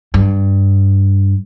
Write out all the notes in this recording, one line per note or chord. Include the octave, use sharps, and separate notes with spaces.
G2